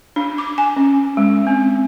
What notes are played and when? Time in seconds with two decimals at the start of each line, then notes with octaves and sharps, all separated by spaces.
0.16 D4
0.38 D6
0.58 G#5
0.76 C#4
1.17 G#3
1.47 C4